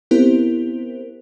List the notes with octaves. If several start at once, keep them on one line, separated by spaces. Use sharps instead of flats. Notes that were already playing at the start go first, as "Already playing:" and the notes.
B3 C4 E4 G4 A#4 C5